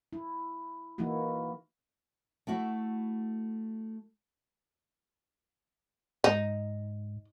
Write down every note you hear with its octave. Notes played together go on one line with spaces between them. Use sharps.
E4
E3 A#3 D#4 E4 F#4
A3 E4 F#4 E5
G#2 D#4